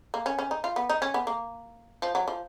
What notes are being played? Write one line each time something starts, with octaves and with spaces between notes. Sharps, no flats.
A#3
C#4
C#4
D#4
F4
B3
D#4
C#4
B3
A#3
F3
F#3
F3